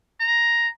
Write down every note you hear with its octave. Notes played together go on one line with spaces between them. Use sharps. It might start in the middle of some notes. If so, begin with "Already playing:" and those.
A#5